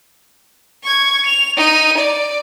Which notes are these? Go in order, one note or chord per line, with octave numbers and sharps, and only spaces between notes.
C#6 G#6
F7
D#4 D#7
D5